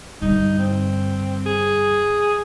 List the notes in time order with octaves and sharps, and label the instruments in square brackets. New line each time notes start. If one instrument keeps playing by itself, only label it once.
[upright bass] G2 D3 [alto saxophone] D#4
[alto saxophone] C4
G#4